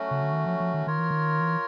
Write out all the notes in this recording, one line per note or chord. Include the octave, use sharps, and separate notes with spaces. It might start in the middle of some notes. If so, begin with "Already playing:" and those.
Already playing: F#3 A3 C#4 F#4
C#3
D3
D#3
F3
F3
D#3
D#3 F4 A#4 C#5
E3
D#3
E3